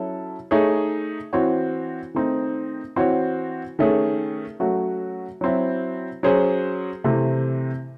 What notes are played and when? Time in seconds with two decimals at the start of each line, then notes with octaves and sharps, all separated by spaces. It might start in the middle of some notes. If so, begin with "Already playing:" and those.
Already playing: F#3 C#4 E4 A4
0.51 A3 D#4 G#4 C#5
1.33 E3 C4 F#4 C#5
2.14 D#3 A3 C4 D#4
2.96 E3 C4 F#4 C#5
3.79 D#3 A3 C#4 G#4
4.60 F#3 A3 C#4 F#4
5.41 F#3 C4 E4
6.23 F#3 C#4 G#4 C5
7.04 C3 E3 A3 C4